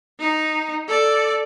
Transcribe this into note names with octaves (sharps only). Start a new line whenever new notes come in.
D#4
A4 D5